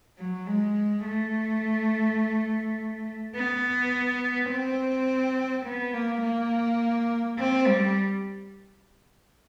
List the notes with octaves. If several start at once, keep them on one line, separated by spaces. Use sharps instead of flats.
F#3
G#3
A3
B3
C4
B3
A#3
A#3
C4
G3